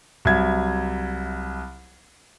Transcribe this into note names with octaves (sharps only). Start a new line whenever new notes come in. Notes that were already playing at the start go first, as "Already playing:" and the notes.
C2 F#3 E5 G#6